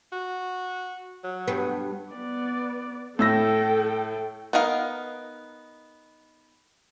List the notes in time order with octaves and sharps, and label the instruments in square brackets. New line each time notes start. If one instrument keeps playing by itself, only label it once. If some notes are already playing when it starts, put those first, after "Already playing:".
[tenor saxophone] F#4
F#3
[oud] G2 B3
[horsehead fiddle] B3 D5
[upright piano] A2 E6 A#6 [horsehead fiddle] A4 G5
[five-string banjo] B3 D#4 A#4 F5